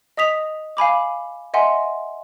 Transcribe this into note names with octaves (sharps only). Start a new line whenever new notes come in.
D#5 D#6 B6 F7
F5 G#5 B5 D6
D#5 E5 F#5 G#5 C6